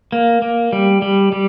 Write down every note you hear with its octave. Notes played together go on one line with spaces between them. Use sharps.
A#3
A#3
G3
G3
G3